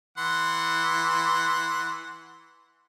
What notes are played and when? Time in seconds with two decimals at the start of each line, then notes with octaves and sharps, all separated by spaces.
0.18 E3 F#5 C6